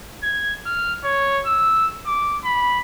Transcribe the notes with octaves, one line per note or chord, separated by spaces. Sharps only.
G#6
F6
C#5
E6
D6
B5